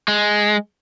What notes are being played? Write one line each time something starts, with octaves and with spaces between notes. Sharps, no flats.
G#3